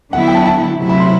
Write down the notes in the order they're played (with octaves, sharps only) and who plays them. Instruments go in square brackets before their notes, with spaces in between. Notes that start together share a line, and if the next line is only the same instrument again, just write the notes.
[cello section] D3 F#3 B3 E4 [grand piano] F#5
[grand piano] G5
A5
A5
[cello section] C3 F#3 A3 E4
[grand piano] B5
C6